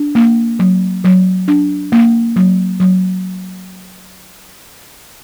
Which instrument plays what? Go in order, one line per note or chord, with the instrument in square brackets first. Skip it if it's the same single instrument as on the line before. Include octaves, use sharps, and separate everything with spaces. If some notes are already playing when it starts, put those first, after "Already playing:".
Already playing: [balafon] D4
A#3
F#3
F#3
D4
A#3
F#3
F#3